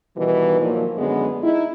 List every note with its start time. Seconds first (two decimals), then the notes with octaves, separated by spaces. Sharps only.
0.17 B2 D#3 E3 G3 D#4
0.61 A#2 D#3 F3 F#3 A#3
0.98 F#2 D3 G#3 B3
1.43 D#4 E4